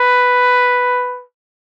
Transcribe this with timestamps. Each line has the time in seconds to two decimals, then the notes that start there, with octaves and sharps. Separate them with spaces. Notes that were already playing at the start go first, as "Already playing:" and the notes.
Already playing: B4